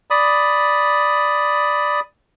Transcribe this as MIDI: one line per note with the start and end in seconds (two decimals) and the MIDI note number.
0.10 2.00 74
0.10 2.00 83
0.10 2.00 87